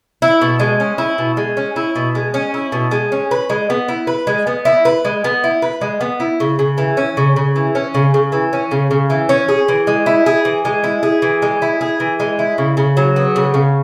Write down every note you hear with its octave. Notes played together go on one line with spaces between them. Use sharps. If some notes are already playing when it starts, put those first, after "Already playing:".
E4
B2
G#3
C#4
E4
B2
G#3
C#4
E4
B2
G#3
C#4
E4
B2
G#3
C#4
B4
G#3
B3
E4
B4
G#3
B3
E4
B4
G#3
B3
E4
B4
G#3
B3
E4
C#3
C#3
E3
C#4
C#3
C#3
E3
C#4
C#3
C#3
E3
C#4
C#3
C#3
E3
C#4
G#4
E3
G#3
E4
G#4
E3
G#3
E4
G#4
E3
G#3
E4
G#4
E3
G#3
E4
C#3
C#3
F#3
B3
C#3
C#3